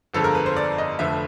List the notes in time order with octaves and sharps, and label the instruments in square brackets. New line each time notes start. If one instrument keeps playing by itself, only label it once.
[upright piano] G1 F2 D3 F3 G#3 A4
A#4
B4
C5
D5
D#5
F1 F2 D3 F3 E5